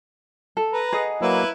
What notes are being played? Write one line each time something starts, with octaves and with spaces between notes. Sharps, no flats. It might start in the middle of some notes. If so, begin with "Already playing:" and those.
A4
B4 A#5
G#4 D#5 F#5
F#3 A#3 E4 B4